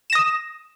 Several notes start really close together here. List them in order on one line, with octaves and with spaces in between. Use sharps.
E7 A#6 D#6